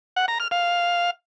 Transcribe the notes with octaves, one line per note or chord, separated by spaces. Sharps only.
F#5
A#5
F6
F5